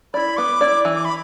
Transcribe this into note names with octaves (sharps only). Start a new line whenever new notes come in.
E4 D5 B5
B3 D6
E4 D5
E3
D6
B5